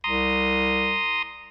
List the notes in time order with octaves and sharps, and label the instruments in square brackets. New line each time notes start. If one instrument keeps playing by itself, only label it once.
[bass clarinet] C2 [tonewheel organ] A#5 C6 D#6